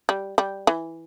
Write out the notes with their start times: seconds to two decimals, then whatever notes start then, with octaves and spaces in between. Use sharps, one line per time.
0.09 G3
0.38 G3
0.67 E3